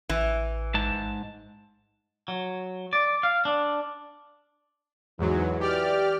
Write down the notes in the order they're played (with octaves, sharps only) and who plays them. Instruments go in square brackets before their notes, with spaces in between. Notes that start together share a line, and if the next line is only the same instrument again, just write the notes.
[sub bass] A1 [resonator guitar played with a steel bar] E3
[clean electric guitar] G#2 A5
F#3
D5
F5
D4
[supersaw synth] E2 G#2 F#3 [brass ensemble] E3
[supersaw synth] G4 D5 F6